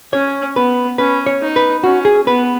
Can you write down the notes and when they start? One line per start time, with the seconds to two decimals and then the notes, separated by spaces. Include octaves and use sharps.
0.13 C#4 C#5
0.56 B3 B4
0.98 C#4 B4
1.26 C#5
1.41 D#4
1.56 B4
1.84 C#4 F#4
2.05 G#4
2.27 B3 B4